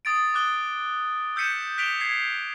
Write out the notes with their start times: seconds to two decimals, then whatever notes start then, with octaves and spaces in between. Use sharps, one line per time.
0.05 D#6 A6 D7
0.34 D6 D#6 F#6 G7
1.36 E6 G6 B6 C#7 D#7 E7
1.78 F#6 B6 D7 E7 F7 G7
2.00 G#6 B6 C7